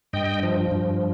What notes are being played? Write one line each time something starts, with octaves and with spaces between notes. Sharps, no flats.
G2 D#5 G5
F3
G2